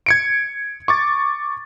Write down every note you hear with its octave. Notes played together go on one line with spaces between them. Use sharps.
G#6 C#7 D7
C#6 D6 A6